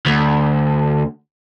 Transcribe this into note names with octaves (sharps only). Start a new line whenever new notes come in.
D2